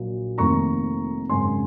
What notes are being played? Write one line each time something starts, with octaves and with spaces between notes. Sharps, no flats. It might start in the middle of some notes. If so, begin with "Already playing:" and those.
Already playing: A#1 A#2 F#3 A#3
F1 F2 D#3 A#3 A#5 C#6
G#1 F#2 C#3 G#3 G#5 C6